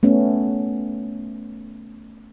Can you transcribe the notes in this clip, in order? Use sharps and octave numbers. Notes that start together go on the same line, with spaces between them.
A3 B3 C#4